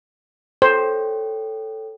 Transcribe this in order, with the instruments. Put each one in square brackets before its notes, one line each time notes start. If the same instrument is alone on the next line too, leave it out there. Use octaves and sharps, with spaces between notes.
[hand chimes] A4 C#5 G5 [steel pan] C5